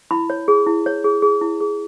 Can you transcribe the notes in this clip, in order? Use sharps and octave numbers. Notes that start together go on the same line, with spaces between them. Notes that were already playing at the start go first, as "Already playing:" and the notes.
E4 B5
C#5
G#4
E4
C#5
G#4
G#4
E4
G#4